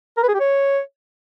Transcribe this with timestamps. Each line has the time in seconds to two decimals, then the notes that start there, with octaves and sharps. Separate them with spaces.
0.17 A#4
0.23 B4
0.29 G#4
0.34 G4
0.40 C#5